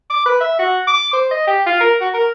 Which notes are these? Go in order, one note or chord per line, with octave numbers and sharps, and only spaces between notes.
D6
B4
E5
F#4
D6
C5
D#5
G4
F4
A#4
F#4
A#4